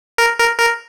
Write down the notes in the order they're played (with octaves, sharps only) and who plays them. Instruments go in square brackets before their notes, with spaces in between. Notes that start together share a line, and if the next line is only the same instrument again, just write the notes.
[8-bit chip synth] A#4
A#4
A#4